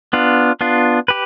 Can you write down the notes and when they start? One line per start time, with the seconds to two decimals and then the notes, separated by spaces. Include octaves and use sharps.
0.13 B3 D4 F4
0.61 B3 D4 F4
1.08 G4 B4